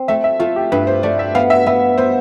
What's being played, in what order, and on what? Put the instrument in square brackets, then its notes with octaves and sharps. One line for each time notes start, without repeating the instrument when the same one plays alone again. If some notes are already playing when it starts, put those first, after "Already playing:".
Already playing: [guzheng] C4
[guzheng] A3 [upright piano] E5
[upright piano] E5
[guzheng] A3 [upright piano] F4
[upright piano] G4
[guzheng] G2 [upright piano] B4
[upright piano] C5
[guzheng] A3 [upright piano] D5
[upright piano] E5
[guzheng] B3 [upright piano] F5
[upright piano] E5
[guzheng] B3 [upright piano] E5
[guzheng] B3 [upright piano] C5